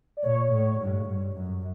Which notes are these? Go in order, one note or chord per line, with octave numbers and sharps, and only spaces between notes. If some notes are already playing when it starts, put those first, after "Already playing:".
D5
A#2 C#5
A2
G#2
G2
F#2